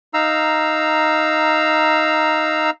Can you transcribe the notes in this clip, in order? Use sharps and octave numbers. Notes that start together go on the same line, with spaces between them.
D#4 F5 A#5 E6